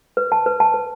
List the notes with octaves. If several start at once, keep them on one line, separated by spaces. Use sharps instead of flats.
B4
A5
B4
A5
B4